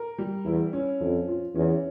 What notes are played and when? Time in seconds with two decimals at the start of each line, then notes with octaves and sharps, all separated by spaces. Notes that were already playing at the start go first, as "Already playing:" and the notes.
Already playing: A#4
0.18 G3
0.45 E2 E4
0.73 C#4
1.00 F2 F3
1.28 F4
1.55 E2 C#4